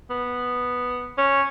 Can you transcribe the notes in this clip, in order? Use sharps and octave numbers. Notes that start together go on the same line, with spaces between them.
B3
C#4